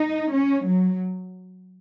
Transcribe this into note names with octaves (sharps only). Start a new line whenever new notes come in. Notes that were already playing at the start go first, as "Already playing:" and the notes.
Already playing: D#4
C#4
F#3